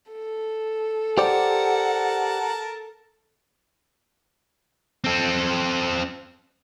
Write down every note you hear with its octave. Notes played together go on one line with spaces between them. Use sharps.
A4
G4 A#4 C5 D5 F#5 A5
C4 A4